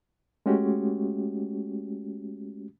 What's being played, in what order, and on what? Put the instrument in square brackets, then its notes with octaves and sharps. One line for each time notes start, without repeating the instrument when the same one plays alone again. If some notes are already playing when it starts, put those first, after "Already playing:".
[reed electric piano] G#3 A3 C#4 F#4 G4